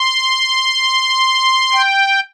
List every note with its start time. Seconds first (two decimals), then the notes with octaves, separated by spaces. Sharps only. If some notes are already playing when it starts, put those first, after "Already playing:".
Already playing: C6
1.73 G5